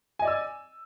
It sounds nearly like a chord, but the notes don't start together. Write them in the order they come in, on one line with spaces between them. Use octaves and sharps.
G#5 D#5 D5 E6